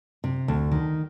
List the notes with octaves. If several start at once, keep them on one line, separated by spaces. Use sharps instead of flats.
C3
D2
D#3